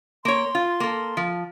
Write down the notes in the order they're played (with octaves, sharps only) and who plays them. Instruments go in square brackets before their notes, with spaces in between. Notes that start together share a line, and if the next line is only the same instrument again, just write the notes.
[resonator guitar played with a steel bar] A#3 C#5 [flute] C6
[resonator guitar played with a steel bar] F4
A#3 A4
F3